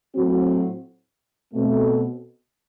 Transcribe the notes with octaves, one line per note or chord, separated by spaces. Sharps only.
A2 F#3 C4 F#4
B2 A3 C4